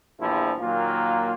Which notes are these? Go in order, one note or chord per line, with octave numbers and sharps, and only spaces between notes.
A#1 E2 F3 G3 E4
A#2 D#3 F#3 A#3 F4